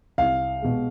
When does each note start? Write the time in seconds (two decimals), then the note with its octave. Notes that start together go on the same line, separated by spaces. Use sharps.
0.18 C2 F5
0.62 B2 G#3